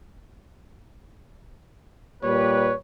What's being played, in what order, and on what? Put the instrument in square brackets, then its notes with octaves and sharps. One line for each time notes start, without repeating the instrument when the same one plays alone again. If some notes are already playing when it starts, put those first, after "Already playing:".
[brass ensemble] A#2 G3 B4 [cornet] C#5